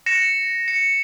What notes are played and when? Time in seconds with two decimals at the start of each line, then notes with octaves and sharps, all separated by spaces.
0.06 A#6 C#7 E7
0.68 C#7